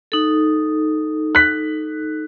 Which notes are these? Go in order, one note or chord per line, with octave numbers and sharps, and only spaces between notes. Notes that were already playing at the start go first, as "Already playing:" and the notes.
D#4 A4
F#6 B6